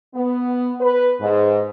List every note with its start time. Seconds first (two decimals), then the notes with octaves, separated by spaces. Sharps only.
0.15 B3
0.81 B4
1.21 G#2